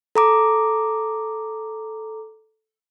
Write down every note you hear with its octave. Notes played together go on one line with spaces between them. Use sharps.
A4 A#5 D6